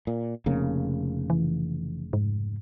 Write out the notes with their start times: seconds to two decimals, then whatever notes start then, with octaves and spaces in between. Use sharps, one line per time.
0.07 A#2
0.46 F1 C#3 A#3
1.30 E3
2.13 G#2